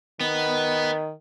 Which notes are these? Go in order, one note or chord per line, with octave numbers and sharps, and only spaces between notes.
D#3 B3